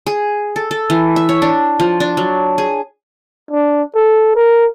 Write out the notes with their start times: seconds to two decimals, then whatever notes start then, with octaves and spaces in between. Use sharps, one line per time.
0.06 G#4
0.56 A4
0.71 A4
0.90 E3
1.16 E5
1.29 C#5
1.42 D4
1.80 F3
2.00 D4
2.17 F#3
2.58 G#4
3.51 D4
3.95 A4
4.36 A#4